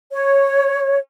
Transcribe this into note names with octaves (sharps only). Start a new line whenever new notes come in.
C#5